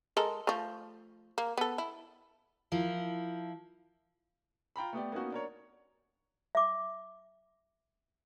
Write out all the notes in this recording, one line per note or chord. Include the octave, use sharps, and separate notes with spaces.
G#3 A4 A#4
F3 A3
A#3
B3 A4
E4
F3 E4 A#4
F4 G5 A#5 B5
A3 B3 G4 D5
A#3 B3 C#4 D#4 F#4
D4 A#4 C#5
E5 D6